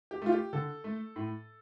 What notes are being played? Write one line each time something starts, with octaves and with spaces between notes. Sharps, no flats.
G4
A3 F4
G4
D3 A4
A3
A2